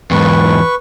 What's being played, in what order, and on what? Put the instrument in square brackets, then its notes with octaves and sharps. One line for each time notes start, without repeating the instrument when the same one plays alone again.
[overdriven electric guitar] E2 G#2 [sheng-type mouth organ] B4 C#6